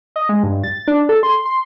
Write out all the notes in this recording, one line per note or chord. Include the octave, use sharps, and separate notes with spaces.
D#5
G#3
G2
A6
D4
A4
C6
C6